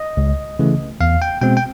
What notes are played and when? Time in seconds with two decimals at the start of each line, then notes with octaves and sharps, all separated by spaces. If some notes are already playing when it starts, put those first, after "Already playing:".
Already playing: D#5
0.17 C#2
0.59 C#3 E3 A3
1.00 E2 F5
1.22 G5
1.41 B2 G#3 C4 G5
1.57 G5